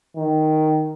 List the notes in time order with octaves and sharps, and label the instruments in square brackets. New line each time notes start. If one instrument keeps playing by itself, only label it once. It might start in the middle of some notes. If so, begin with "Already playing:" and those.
[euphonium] D#3